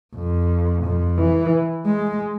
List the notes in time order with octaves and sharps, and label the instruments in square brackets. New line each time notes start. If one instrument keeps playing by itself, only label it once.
[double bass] F2
F2
E3
G#3